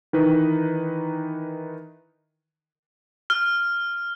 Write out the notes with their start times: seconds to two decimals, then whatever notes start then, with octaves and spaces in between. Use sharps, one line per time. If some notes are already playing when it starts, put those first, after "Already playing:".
0.13 D#3 E3 D#4 B4
3.30 F6